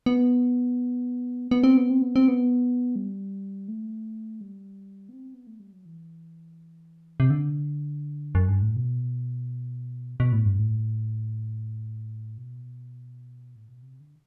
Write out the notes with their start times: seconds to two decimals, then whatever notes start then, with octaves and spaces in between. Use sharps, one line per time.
0.06 B3
1.51 B3
1.64 C4
1.77 B3
1.90 C4
2.02 B3
2.16 C4
2.28 B3
2.96 G3
3.68 A3
4.41 G3
5.09 B3
5.13 C4
5.34 B3
5.47 A3
5.60 G3
5.73 F#3
5.85 E3
7.20 C3
7.30 D3
8.35 F#2
8.48 G2
8.62 A2
8.76 B2
10.20 B2
10.32 A2
10.46 G2
10.59 A2
12.38 B2
13.56 A2
13.68 B2
13.82 C3
14.00 D3